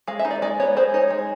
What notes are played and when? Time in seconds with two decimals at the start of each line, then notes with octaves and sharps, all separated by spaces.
0.08 G#3 F5
0.19 E5
0.25 D#4
0.31 D5
0.42 G#3 D5
0.60 B3 C#5
0.77 G#3 C5
0.94 D#4 C#5
1.10 G#3